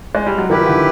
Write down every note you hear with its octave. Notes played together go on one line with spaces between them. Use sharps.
G#3
G3
F#3
D#3 F3 E4 G4 B4
D3 E3